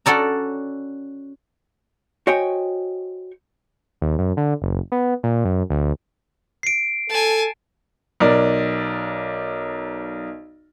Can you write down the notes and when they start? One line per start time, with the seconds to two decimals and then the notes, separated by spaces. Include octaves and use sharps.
0.06 C#4 F#4 A4 D5 A#5
2.27 F#4 C5 C#5 D#5 G5 G#5
4.02 D#2
4.19 F#2
4.37 D3
4.62 F#1
4.92 B3
5.23 A#2
5.45 F#2
5.70 D2
6.63 C7 D7
7.09 A4 G#5 A5
8.20 B1 A#4 D5